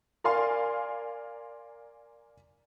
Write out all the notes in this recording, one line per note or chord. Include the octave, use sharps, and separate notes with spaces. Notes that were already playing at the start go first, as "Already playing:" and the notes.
A#4 D5 F5 G#5 C6